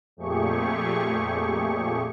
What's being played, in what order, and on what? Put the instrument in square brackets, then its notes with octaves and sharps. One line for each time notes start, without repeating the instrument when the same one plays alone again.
[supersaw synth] F2 A#2 A3 G4 G#4 C#6